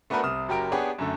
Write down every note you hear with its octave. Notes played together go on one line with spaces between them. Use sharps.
A3 B3 D4 F#4 A#4 B4
C2 C3 D#6 F6 E7
F#1 F#3 G4 A#4 D7
B3 D4 G4 G#4 C#5
F#2 D3 A3